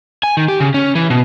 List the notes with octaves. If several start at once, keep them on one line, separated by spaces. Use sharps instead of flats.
G#5
D#3
G4
C#3
C#4
E3
B2